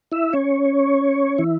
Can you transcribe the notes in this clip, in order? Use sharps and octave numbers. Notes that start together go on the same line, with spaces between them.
E4 E5
C#4 C#5
E3 E4